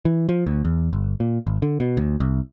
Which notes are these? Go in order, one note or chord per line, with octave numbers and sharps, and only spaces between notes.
E3
F3
D2
E2
G1
A#2
G#1
D3
B2
D2
C2